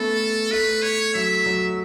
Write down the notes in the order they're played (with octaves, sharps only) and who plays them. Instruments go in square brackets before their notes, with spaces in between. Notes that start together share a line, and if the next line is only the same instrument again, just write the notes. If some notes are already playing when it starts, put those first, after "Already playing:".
Already playing: [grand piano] A3 B3 C#4 [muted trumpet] A4
[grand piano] A3 [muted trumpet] B4
[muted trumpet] C#5
[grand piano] F#3 [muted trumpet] E5
[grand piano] F#3